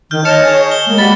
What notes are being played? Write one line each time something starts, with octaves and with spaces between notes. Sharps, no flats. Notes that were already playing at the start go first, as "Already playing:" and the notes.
D#3 F6 G6
C#5 D#5 A5 F6 G6 C#7 E7
G#4
G7
G#3 A#3
G3 F#4 B5 A6